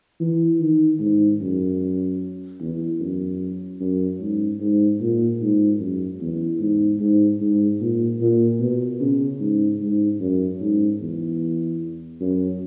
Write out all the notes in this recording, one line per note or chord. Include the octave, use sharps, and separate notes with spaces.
E3
D#3
G#2
F#2
E2
F#2
F#2
G#2
G#2
A#2
G#2
F#2
E2
G#2
G#2
G#2
A#2
A#2
B2
C#3
G#2
G#2
F#2
G#2
E2
F#2